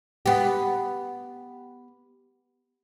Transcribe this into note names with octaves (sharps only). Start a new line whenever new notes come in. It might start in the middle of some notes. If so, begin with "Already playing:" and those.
B3 G4